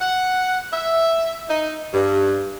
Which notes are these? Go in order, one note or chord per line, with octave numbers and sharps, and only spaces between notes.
F#5
E5
D#4
G2